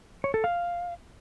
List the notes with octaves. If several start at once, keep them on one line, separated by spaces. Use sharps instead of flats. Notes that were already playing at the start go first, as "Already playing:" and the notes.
C#5
A4
F5